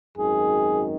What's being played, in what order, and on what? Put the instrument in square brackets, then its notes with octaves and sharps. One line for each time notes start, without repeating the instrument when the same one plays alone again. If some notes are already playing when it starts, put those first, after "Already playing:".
[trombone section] G#1 F#2 D#3 G#4